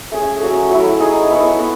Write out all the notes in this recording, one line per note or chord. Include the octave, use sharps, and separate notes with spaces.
A3 C#4 G#4
F#3 C#4 F#4 A4
F#3 A3 E4
D#4 G#4 D#5
B3 E4 A4 C#5
B3